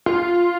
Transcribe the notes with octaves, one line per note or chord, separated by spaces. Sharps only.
F4